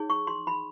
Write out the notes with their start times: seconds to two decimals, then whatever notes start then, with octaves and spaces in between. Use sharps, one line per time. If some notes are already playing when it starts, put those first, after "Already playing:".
Already playing: D#4 G#4 C#5
0.10 C#6
0.27 C6
0.47 B5